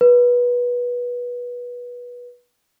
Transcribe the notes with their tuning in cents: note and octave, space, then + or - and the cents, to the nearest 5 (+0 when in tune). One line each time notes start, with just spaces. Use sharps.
B4 -20